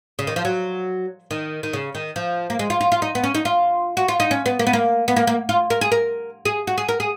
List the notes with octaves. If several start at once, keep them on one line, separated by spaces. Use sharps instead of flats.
C#3
D#3
F3
F#3
D#3
D#3
C#3
D#3
F3
A#3
G#3
F4
F4
F4
D#4
B3
C#4
D#4
F4
F#4
F4
D#4
C#4
B3
A#3
B3
A#3
B3
A#3
A#3
F4
A#4
G#4
A#4
G#4
F#4
G#4
A#4
G#4